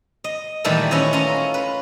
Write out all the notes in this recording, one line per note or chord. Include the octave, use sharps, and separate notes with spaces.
D#5
A#2 D#3 E3 G3 A3
C#4 E4 B4 C#5 D#5
C#4 F4 A#5
B4